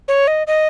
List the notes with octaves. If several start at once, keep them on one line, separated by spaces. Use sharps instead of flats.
C#5
D#5
D#5